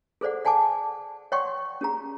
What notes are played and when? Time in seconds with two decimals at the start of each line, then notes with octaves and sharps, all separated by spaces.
0.21 G#4 A4 C5 D5 F#5
0.45 D5 F#5 G#5 A5 D6
1.32 C#5 D5 F#5 G5 C6 C#6
1.81 C#4 G4 G#4 A#5